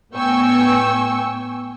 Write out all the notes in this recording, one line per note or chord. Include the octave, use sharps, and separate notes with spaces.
A2 B3 G5 G#5 C#6 E6